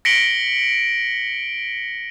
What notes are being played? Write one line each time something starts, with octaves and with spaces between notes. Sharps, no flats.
A#6 B6 C#7 D7 F#7 G7